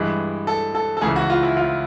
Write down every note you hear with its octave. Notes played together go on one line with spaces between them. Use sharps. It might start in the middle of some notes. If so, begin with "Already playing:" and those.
Already playing: G2 E3 G#3
A4
A4
A4
C#2 C#3 E3 G#4
F#4
F4
E4
F4